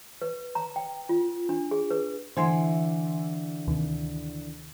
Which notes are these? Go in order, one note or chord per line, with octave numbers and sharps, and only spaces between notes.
B4
A#5
G5
F4
D4
G#4
B4
D3 E3 C5 G#5 C6
D2 C3 D#3